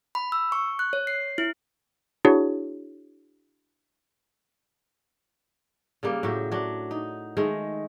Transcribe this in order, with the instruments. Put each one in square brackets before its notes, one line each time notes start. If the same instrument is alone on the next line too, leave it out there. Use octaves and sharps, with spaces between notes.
[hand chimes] B5
E6
C#6
F#6
C#5
C7
E4
[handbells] D4 E4 F#4 G#4 C#5
[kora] C#3 G3 A#3
A2 F#3 G4
F#3 D4
D#4
D#3 G#3 A3